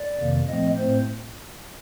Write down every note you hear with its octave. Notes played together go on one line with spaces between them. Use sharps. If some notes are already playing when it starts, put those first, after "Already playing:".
Already playing: D5
F2 C3 D#3 A#3
A#2 F3 A3 C4 D#5
A2 A3 C4 C5